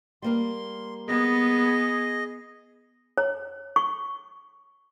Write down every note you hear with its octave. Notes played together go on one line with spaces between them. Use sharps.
G3 A#3 A#4 C6
B3 G#4 D#5
C#5
C#6